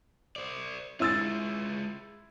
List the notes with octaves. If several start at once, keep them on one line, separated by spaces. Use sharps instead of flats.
C5 D5
G#3 E4 F4 E6 A6